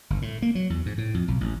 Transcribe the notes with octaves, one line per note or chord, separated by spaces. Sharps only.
G1
A2
A#3
F#3
E2
G#2
A2
F2
B1
A1